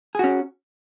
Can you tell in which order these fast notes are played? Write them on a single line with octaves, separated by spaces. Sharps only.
G#4 F#4 C#4